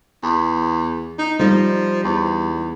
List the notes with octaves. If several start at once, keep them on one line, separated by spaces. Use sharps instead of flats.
E2
D#4
F3 G3 D#4
E2